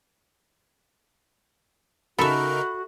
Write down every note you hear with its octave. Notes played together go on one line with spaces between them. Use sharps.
C#3 D#4 F#4 A4 A#4 E5 B5